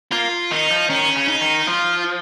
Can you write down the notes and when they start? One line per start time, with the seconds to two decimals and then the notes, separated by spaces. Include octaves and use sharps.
0.12 A#3 F4
0.51 D#3 D#4
0.71 F3
0.90 D#3 C#4
1.16 C#3
1.28 D#4
1.41 D#3
1.67 F3 F4